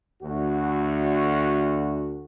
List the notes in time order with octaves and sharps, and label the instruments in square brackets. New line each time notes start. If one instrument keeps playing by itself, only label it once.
[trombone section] D2 F#4